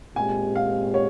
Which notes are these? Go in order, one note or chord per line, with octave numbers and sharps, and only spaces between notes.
A#2 G#3 C4 G4 G#5
F5
C#5